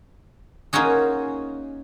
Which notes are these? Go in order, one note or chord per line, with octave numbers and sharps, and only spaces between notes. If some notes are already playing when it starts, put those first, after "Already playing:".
A#3 C#4 D#4 F4 F#4 G#4